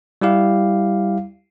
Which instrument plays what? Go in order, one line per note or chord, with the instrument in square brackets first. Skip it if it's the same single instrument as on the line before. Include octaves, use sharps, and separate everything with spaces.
[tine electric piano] G3 E4 G4 F5